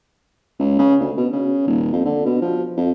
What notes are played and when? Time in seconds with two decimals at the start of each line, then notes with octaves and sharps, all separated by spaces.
0.60 C#2
0.79 C#3
1.00 D2
1.18 B2
1.33 C#3
1.67 D#1
1.93 F2
2.05 D3
2.25 B2
2.42 F3
2.77 F2